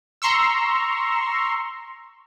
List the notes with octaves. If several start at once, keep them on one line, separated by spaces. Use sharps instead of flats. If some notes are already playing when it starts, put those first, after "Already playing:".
A#5 C6 C#6 E6